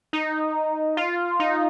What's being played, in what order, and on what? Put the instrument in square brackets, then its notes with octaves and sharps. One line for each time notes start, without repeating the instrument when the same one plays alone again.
[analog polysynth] D#4
F4
D#4